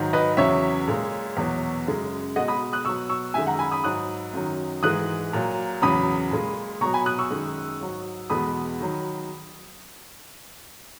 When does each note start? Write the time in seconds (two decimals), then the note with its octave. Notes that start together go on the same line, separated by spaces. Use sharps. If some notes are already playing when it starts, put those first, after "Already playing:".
Already playing: G#2 D#3 F#3
0.13 B4 D#5
0.37 E2 C#3 F#3 C#5 E5
0.88 A#2 G#3
1.37 E2 B2 F#3
1.87 F#2 C#3 G#3
2.36 B2 G#3 D#5 F#5
2.48 B5 D#6
2.73 D#6 F#6
2.85 B2 F#3 C#6 E6
3.09 C#6 E6
3.34 F#2 D#3 G#3 E5 G#5
3.47 F#5 A#5
3.59 G#5 B5
3.72 B5 D#6
3.84 G#2 F#3 D#6 F#6
4.33 F#2 D#3 F#3
4.83 G#2 E3 G#3 D#6 F#6
5.33 A#2 F#3
5.82 E2 C#3 F#3 B5 D#6
6.31 A#2 G#3
6.81 B2 F#3 A#5 C#6
6.94 G#5 B5
7.06 D#6 F#6
7.19 C#6 E6
7.31 F#2 D#3 G#3
7.81 G#2 F#3
8.30 E2 B2 G#3 B5 D#6
8.81 D#3 F#3